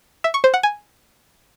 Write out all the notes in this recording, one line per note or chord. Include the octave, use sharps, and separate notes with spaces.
E5
C#6
C5
F#5
G#5